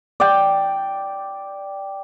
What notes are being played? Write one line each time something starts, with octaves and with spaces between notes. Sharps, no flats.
D5 G5